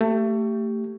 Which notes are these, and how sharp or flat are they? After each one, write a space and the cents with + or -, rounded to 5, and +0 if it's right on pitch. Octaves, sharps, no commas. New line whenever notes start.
A3 +25 G4 +0